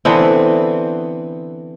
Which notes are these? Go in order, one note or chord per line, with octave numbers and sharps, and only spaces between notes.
D3 E3 B3 C4